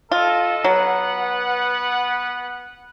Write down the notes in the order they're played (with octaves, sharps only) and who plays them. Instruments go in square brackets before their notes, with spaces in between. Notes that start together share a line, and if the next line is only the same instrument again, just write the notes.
[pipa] F4 [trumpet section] A4 D#5
[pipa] F#3 [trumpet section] B3 B4 F#5